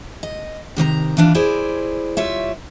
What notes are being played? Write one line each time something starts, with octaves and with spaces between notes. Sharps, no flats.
D#5
C3 D#3 C#5 A#5
D#2 E3 D4 F4
E4 G#4 C5 D5
G3 F4 C#5 E5